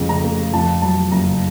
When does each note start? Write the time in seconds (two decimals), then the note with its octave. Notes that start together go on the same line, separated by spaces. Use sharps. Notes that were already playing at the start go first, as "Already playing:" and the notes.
Already playing: F2 C#3 F3 A3
0.09 A#5
0.24 A3
0.53 F2 A5
0.82 F#3 A5
1.12 F#1 A#5